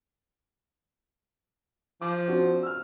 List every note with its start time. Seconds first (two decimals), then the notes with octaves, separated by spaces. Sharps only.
2.02 F3 D6
2.28 C4 D4 F#4
2.63 E6 F6